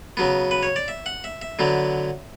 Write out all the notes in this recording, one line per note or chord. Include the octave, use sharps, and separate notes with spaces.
C#3 F#3 B3
B4
C#5
D5
E5
F#5
E5
E5
D3 F#3 B3